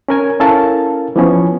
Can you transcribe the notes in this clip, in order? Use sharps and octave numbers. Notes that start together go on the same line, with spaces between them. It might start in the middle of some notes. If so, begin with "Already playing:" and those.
C#4 A#4 G#5
C#4 E4 A4 A#4 F5 A5
E3 F3 B3 C#4